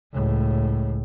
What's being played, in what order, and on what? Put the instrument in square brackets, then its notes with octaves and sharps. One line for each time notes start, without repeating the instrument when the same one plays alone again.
[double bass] C#2 A2